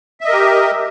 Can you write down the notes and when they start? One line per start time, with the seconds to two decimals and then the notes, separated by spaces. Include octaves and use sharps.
0.21 E5
0.25 D#5
0.29 A#4
0.33 G4